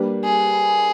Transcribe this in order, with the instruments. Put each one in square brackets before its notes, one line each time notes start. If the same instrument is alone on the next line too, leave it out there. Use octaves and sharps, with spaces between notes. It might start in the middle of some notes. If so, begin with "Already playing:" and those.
Already playing: [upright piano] G3 A#3 D4 G4 B4
[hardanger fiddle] G#4